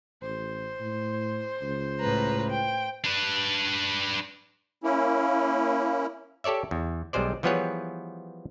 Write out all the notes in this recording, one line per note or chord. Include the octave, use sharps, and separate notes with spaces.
A1 C5
A2
C#2
A2 B4 A#5
G5
D4 B4
A#3 C#4 E4
G4 A4 C#5 D5 E5
E2
B1 G3 G#3 C5 D5
E3 F3 G3 B3 G#4 C#5